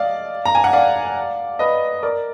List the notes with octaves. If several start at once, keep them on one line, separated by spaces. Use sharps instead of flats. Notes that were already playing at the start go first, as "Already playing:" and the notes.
Already playing: D5 D#5 F5
A#5
G#5
F#5
D5 F5
B4 D#5
A#4 D5